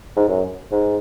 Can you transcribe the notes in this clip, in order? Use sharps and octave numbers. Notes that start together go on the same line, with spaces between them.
G#2
F#2
G#2